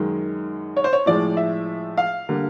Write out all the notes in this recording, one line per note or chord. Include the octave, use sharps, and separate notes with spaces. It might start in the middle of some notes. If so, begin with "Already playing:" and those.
Already playing: F#2 D#3 G#3
C#5
C5
C#5
A2 F3 G#3 D5
E5
F5
D3 G3 A#3